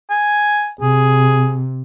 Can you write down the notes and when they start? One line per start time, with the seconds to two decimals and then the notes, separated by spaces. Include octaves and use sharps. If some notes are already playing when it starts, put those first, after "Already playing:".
0.10 G#5
0.81 C3 G#4